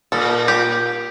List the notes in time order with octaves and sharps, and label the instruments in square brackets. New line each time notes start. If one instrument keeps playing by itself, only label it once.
[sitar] A#2 [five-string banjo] A4
[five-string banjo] G4